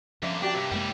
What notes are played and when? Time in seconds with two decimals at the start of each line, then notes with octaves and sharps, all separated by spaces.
0.23 G2 D3 F3 A#3 C#4 C#5 E5
0.42 D4 F#4 G4 D5 G5
0.54 G2 C3 C#5
0.71 F#2 E3 G3 G#3 A#3 C#5 G5